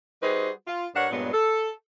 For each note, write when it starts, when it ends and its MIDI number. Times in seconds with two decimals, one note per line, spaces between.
0.22 0.49 55
0.22 0.49 63
0.22 0.49 66
0.22 0.49 68
0.22 0.49 71
0.22 0.49 72
0.67 0.87 65
0.94 1.09 43
0.94 1.09 62
0.94 1.09 70
0.94 1.09 73
0.94 1.09 78
1.10 1.29 43
1.10 1.29 46
1.10 1.29 54
1.10 1.29 56
1.10 1.29 59
1.33 1.70 69